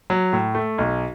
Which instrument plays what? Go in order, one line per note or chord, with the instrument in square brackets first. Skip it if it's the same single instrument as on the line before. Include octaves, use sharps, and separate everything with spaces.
[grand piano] F#3
A2
A3
B1